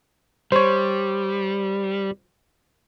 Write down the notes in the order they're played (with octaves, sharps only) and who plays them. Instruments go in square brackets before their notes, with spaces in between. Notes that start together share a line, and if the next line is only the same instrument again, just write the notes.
[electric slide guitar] G3 [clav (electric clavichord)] C5 C#5